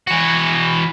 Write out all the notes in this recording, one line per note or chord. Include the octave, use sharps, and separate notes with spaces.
E3 F#4